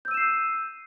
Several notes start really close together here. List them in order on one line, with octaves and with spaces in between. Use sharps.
G6 E6 D#7 E7 C7